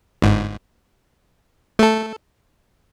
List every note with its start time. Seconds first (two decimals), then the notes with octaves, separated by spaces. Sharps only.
0.22 G1 G#2
1.79 A3 A4